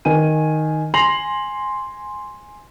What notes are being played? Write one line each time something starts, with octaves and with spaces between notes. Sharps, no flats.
D#3 G#5 D#7
G#5 C6 A#6 C7 F7 F#7